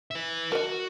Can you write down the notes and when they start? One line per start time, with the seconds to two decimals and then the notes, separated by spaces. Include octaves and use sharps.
0.11 B4 E5
0.52 F#4 A#4 D#5